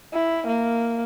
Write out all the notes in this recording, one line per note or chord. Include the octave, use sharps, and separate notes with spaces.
E4
A#3